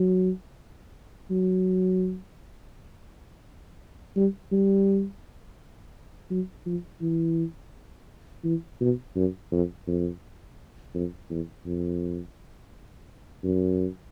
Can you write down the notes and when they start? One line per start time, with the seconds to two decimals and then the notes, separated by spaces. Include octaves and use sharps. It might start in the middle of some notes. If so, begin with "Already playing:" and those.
Already playing: F#3
1.30 F#3
4.16 G3
4.51 G3
6.30 F#3
6.66 F3
7.01 E3
8.44 E3
8.81 B2
9.16 F#2
9.52 F2
9.87 F2
10.94 F2
11.30 E2
11.66 F2
13.44 F#2